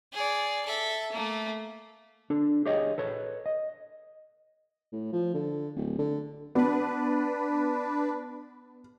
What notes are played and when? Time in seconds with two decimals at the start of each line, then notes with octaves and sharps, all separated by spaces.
0.13 G#4 D5
0.65 A4 E5
1.12 A3 A#3
2.30 D4 A4
2.66 G4 G#4 C#5 D#5
2.98 A4 B4 C#5
3.46 D#5
4.92 A2
5.12 F3
5.34 D3
5.76 D1
5.99 D3
6.55 B3 D4 B4